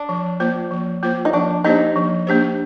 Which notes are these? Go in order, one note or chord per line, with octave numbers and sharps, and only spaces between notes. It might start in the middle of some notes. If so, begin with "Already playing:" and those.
Already playing: D4
F3
A#3 F4 C5
F3
A#3 F4 C5
D#4
F3 D4
A#3 D4 D#4 G4 C5
F3
A#3 D4 G4 C5